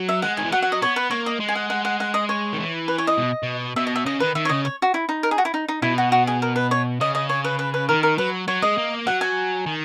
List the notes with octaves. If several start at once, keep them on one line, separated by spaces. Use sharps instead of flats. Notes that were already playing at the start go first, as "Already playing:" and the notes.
Already playing: F#3
E5
G#3 F#5
D#3 G#5
E3
F#3 F#5
F#5
D#5
B3 C#5
B4
A#3 C#5
D#5
G#3
G#5
F#5
F#5
F#5
F#5
D#5
C#5
D#3
E3
B4
C#5
D#5
B2
B2
B2 E5
D#5
E5
C#3 D#5
D#3 B4
D#3 E5
C#5
C#3 D#5
C#5
F#4
E4
D#4
A#4
G#4
F#4
E4
D#4
D#4
B2 E4
F#4
F#4
G#4
A#4
B4
C#5
C#3 D#5
D#5
C#5
B4
B4
B4
D#3 A#4
A#4
F#3 B4
F#3 C#5
G#3 D#5
A#3
F#3 F#5
G#5
D#3